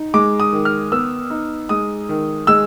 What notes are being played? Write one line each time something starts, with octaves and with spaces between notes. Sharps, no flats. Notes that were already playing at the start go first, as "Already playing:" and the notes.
Already playing: D#4
G#3 D6
D#6
D#3
F6
B3 E6
D#4
G#3 D#6
D#3
G#3 E6